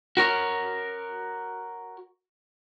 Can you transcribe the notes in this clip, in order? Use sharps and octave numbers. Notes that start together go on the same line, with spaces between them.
F#4 A#4 C#5